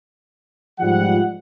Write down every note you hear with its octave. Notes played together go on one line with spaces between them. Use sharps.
G#2 F3 G3 F4 F#5